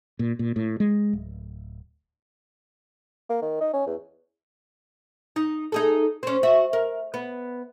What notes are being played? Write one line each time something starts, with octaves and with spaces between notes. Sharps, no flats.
A#2
A#2
A2
G#3
D1
A#3
D#3
D#4
C#4
E2
D#4
D#4 G#4 A4
C4 C#4
F#4 E5
A#4
B3